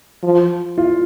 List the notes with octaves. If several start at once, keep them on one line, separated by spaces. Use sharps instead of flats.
F3
F4